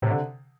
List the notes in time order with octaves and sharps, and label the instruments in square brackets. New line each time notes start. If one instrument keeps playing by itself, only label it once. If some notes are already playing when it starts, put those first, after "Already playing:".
[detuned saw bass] A2 [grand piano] C3
[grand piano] D3